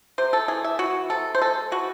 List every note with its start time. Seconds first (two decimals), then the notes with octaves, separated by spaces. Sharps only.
0.18 C3 C5
0.33 A4
0.48 E3 G#4
0.64 E5
0.79 E3 F#4
1.10 C3 A4
1.35 C5
1.41 G#3 A4
1.72 E3 F#4